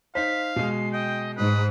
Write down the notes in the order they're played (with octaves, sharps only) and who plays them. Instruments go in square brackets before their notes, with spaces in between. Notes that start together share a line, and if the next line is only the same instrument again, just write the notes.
[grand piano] D#4 C5 [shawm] F5 [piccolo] B6
[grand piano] B2 G#3 [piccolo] C7
[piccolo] D#5 [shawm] G5
[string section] G#2 [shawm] B4 [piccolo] D#6